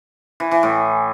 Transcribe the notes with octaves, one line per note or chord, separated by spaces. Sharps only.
E3
E3
A2